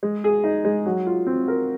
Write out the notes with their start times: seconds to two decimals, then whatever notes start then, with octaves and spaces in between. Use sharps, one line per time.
0.03 G#3
0.24 G#4
0.44 D#4
0.65 G#3
0.86 F#3
1.07 F4
1.27 C4
1.48 A#4